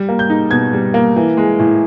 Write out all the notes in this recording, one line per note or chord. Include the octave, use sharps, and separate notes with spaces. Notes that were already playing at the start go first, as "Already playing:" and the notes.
Already playing: G3
A#3
G6
D#4
B2 G#6
G3
A#3
E3
G#3
A2